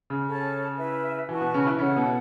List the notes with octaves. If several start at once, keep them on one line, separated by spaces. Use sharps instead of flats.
C#3
C#4 A4 C#5 A5
E4 B4 E5
E3 F#4 B4 A5 C#6
B2 B3
C#3 C#4
E3 E4
C#3 C#4 E4 A4 C#5 F#5
B2 B3